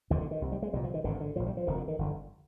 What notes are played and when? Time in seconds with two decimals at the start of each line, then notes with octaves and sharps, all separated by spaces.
0.10 F1 D#2 D3 D#3
0.21 D3
0.31 D#3
0.42 C2 C3
0.52 G3
0.62 G#3
0.73 C2 A#2 G3
0.84 F3
0.94 D#3
1.04 G#1 G#2 D3
1.20 D3
1.36 A#1 A#2 F3
1.46 G3
1.57 F3
1.67 F1 F2 D3 D#3
1.78 D3
1.88 D#3
1.98 G1 F2 D3